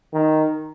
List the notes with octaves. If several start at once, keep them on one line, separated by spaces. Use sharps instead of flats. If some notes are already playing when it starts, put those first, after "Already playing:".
D#3